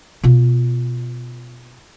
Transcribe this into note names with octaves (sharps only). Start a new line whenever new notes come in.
B2 F4